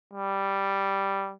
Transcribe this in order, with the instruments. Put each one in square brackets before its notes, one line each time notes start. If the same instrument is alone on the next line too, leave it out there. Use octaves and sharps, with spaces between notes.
[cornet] G3